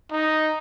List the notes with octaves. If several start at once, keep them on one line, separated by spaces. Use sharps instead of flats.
D#4